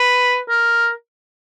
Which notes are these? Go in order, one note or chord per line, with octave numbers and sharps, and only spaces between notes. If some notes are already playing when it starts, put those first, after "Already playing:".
Already playing: B4
A#4